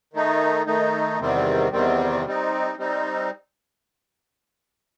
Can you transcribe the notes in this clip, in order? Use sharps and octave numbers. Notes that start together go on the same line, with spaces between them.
D#3 A3 D#4
D#3 A3 D#4
E2 C3 D#3 G3 C4
E2 C3 D#3 G3 C4
G3 C4 D#4
G3 C4 D#4